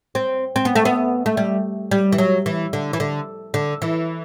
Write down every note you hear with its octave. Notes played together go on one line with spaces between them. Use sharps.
C4
C4
B3
A3
B3
A3
G3
G3
E3
F#3
E3
D3
E3
D3
D3
E3